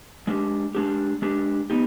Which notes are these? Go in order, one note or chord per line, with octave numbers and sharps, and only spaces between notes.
G#3 D4 G4
G#3 D4 G4
G#3 D4 G4
B3 D#4 G4